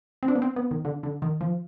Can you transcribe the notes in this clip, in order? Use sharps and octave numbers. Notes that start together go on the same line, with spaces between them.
C4
D4
B3
C4
B3
D#3
D3
D3
D#3
F3